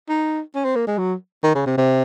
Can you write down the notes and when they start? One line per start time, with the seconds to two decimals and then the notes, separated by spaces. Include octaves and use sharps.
0.09 D#4
0.54 C#4
0.65 C4
0.76 A#3
0.87 G#3
0.98 F#3
1.43 D#3
1.55 C#3
1.66 C3
1.77 C3